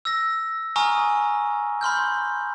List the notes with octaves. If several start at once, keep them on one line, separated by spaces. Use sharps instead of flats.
E6 A#6
G#5 A#5 C#6 D#6 F6
B5 C6 F6 G6